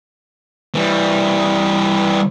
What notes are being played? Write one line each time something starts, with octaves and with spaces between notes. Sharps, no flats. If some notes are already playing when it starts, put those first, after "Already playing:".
E3 G3